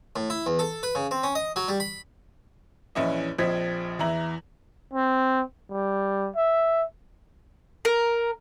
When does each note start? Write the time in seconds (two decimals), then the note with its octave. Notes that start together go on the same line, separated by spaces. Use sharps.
0.16 A2
0.30 E4
0.46 E2
0.59 A4
0.83 B4
0.95 C#3
1.11 C4
1.23 C#4
1.35 D#5
1.56 F#3
1.68 G3
1.80 B5
2.95 A#1 E3 C#4 E4 D#5
3.39 A#1 F3 C4 D#5 G#6 B6
3.99 E2 E3 E5 A#5 F#7
4.93 C4
5.70 G3
6.35 E5
7.85 A#4